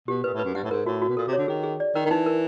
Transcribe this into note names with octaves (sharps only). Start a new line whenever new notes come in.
B2 G4
A#2 B4
A2
B4
F#2
G2 F#5
A2
G#2 A#4
A2 F#4
F#4
B2
A#2 A4
C3
C#5
D3
D#3 G#4
G#4
D5
D#3 A#4
D#3
E3 D#4
A#4